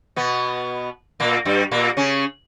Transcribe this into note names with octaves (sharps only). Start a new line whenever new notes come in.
B2 B3
A#2 A#3
G2 G3
A#2 A#3
C#3 C#4